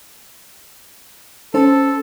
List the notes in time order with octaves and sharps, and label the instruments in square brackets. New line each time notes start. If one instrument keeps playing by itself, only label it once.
[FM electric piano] C#4 C5 A5 [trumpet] A4